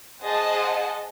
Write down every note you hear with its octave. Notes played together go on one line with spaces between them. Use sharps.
G#4 C5 D#5 F#5 A5